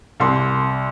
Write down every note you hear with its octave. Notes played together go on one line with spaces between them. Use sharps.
C2 C6